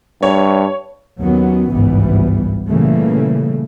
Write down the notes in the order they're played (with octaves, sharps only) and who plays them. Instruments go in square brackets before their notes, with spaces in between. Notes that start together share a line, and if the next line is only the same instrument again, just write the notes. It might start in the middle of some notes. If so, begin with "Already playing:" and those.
[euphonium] G2 [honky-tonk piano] C#5
[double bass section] D#2 D#3 F#3 B3 C#4
G#1 C#2 G2 E3 G3 B3
A#2 C#3 E3 G3 A3 A#3